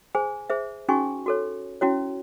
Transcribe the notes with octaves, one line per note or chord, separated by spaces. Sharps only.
G#4 C5 G#5
G#4 C5 E5
C#4 D#4 F#4 G#4 G#5 C#6
F#4 A4 C#5
C#4 E4 F#4 C#5